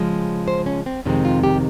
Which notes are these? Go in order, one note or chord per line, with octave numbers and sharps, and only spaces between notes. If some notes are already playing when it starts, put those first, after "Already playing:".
Already playing: C#3 F3 G#3
C5
C#4
C4
F2 C3 D#3 G#3 C4 C#4
F4
G4